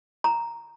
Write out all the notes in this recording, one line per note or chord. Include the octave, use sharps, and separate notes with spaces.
A#5